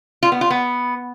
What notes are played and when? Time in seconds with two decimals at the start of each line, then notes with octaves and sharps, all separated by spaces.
0.23 F4
0.32 B3
0.41 F4
0.50 B3